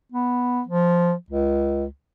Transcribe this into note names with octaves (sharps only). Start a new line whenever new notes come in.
B3
F3
C#2